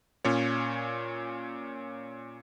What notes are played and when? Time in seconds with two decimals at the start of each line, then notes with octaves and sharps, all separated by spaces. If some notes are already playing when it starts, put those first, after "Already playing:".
0.25 A#2 C#4 C#5